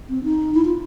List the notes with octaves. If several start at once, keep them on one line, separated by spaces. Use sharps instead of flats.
C4
D#4
E4
F4